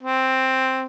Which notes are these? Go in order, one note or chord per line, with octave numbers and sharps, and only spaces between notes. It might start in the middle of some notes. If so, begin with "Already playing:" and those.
C4